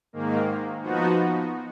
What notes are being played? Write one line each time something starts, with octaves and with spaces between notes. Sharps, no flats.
G#2 D#3 A#3
F3 B3 D#4 F#4